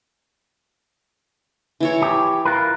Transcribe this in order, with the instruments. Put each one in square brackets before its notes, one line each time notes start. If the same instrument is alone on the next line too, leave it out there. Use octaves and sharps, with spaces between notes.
[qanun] E3 E4 C#5
[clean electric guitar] G4
F4 A#4 B4